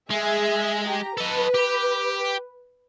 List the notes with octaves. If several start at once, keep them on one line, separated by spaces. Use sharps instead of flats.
G#3 G#4 E5
G4 A#5
A4 B4 D#5
G4